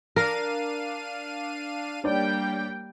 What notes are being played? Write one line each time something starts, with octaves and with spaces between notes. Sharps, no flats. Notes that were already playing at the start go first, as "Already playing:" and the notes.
D4 A#4 F5 D#7
G3 A#3 D4 C#5 D5 G5